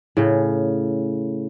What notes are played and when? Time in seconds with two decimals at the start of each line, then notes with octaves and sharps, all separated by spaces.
0.17 A2 C#3